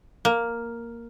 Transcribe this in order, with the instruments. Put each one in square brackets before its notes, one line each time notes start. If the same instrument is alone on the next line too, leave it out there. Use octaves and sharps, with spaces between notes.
[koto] A#3